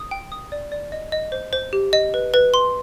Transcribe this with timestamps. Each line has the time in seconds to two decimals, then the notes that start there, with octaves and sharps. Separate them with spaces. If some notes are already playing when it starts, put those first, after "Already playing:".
Already playing: D#6
0.11 G5
0.32 D#6
0.52 D5
0.72 D5
0.92 D#5
1.12 D#5
1.32 C5
1.53 C5
1.73 G4
1.93 D#5
2.14 B4
2.34 B4
2.54 C6